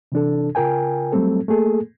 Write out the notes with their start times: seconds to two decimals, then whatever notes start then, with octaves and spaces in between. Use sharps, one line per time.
0.12 C3 E3 D4 A4
0.55 C#3 F4 A#4 G5 G#5
1.12 F#3 G3 A3 C4 A4
1.48 A3 A#3 G#4 A4